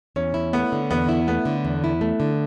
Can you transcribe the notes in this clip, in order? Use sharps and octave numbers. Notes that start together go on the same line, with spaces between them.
E2 C#4
E4
A3 B3
D3
E2 B3
E4
A3 B3
D3
E2
E4
A3
D3